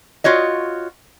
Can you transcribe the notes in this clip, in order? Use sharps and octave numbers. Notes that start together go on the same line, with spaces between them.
F4 F#4 C#5 D#5